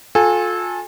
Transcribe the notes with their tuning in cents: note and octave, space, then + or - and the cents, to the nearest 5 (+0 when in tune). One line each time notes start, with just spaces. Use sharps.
F4 +35 A4 -15 G#5 -20